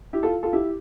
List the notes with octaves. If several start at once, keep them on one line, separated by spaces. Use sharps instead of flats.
E4 G4
F4 A4
F4 A4
E4 G4